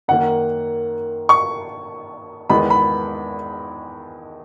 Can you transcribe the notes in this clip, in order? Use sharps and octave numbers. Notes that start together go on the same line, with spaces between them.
F#2 D#3 A#3 F#5
C#6
E2 D#3 G#3 B3 B5
B5